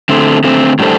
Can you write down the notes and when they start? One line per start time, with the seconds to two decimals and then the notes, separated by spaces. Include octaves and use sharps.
0.09 D3 A3 C4
0.44 D3 A3 C4
0.79 A2 G3 D4 A4 C5